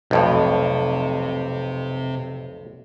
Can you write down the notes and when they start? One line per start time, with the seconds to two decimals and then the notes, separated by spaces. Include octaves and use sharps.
0.11 B1 F2 A2 C3 G5